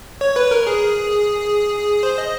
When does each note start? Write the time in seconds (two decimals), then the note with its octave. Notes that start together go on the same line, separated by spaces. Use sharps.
0.21 C#5
0.36 B4
0.51 A#4
0.67 G#4
2.03 C5
2.18 D#5